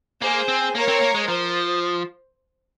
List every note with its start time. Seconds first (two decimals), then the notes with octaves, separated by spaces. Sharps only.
0.22 A#3 G#4 C5
0.48 C4
0.75 A#3 A#4 C#5
0.88 C4
1.01 A#3
1.15 G#3
1.28 F3 C5